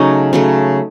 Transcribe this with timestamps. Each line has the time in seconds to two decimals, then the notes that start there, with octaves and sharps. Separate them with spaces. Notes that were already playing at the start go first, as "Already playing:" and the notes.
Already playing: C#3 F#3 A3 C#4 D#4
0.33 C#3 F#3 A3